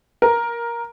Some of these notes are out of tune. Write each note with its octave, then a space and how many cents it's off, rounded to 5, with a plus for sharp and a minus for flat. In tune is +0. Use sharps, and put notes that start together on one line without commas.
A#4 +10